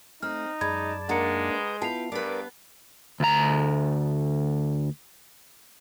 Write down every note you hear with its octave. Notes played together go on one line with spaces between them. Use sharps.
A3 C4 D#4 F6
F#2 G#3 D5 A5 B5 G#6
G#3 A#3 D4 D#4 F#5 A#5 C#7
B4 D#6 G6
B3 E4 F4 B4 G5 A5 C7 F7
G2 B3 A#4 B4 D5 D6
D2 A#5